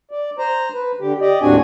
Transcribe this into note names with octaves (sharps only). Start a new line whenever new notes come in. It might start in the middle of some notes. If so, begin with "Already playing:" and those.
D5
C5 A#5
B4
D3 G4
G4 D5 D#5
D#2 A2 C4 D4 F#4 G#5